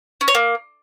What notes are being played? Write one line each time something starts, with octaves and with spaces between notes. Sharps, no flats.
C#4
C#5
A#3